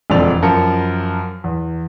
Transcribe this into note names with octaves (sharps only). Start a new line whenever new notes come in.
E1 F2 D3 C4 D5 F7
F#2 F3 A#4 C#7
E2